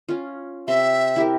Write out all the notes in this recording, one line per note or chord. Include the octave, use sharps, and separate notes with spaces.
C#4 F4
C3 E5 C6
E4 G4 A#4